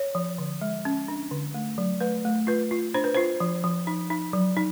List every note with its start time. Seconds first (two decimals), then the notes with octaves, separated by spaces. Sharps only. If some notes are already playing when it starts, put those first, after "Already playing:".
Already playing: C#5
0.15 F3
0.38 D3
0.61 G#3
0.85 C#4
1.08 D4
1.31 D3
1.54 A3
1.78 F#3
2.01 A3 B4
2.25 A3
2.47 F4 B4
2.71 F4
2.94 D4 C5
3.04 B4
3.14 F4 C5
3.40 F3
3.64 F3
3.87 D#4
4.10 D#4
4.33 F#3
4.57 D#4